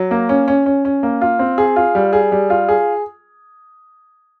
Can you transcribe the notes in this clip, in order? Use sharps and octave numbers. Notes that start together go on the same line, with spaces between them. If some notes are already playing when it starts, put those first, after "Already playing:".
Already playing: F#3
A#3
C#4
C#4
C#4
C#4
A#3
F4
C4
G#4
F4
G3
G#4
G3
F4
G#4